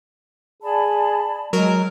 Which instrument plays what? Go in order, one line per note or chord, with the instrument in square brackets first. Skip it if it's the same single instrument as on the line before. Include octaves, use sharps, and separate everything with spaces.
[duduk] G#4 [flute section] D5 A5 B5
[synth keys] F#3 A#4 [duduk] G#3